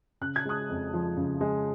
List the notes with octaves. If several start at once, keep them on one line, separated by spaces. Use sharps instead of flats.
C#3 F#6
G#6
G#3 D#6 F#6
F2
F3
C#3
G#3